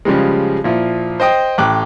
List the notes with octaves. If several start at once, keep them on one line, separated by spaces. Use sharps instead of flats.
C#3 F3 G3 G#3
A#2 F3 E4
C5 D#5 G5 D#6
A1 G5 D6 F#6